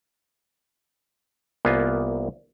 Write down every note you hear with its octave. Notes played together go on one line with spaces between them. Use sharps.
C2 A#3 B3 F4 G#5